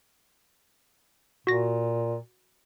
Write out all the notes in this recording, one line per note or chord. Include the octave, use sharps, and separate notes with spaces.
A#2 F#4 A#6